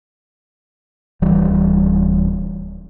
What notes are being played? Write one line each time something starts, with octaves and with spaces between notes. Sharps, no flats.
D1 E3 G3